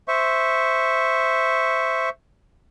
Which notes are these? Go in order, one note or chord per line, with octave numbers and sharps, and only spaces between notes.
C5 E5 C#6